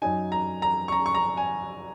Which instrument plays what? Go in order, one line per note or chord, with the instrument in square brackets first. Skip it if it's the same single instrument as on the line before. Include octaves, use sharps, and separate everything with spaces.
[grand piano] F#2 F#3 D#4 G#5
A#5
A#5
C#6
A#5
C#6
A#5
G#5